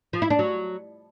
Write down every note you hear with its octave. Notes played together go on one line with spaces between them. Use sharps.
F3
E4
D4
F#3